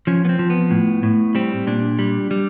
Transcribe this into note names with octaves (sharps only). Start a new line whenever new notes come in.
F3 C#4
B3
C4
F3
B3
A2
A2
G3 C4
A#2 D4
G3
G3